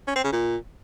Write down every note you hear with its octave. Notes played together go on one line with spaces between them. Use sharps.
C#4
C4
C#3
A#2